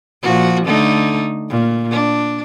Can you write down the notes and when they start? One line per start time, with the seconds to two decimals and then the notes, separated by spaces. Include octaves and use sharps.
0.23 A#2 F3 F#4
0.66 D3 A3 D#4
1.50 A#2
1.91 D4